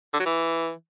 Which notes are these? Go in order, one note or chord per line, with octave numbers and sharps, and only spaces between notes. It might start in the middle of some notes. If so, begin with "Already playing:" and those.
D3
F#3
E3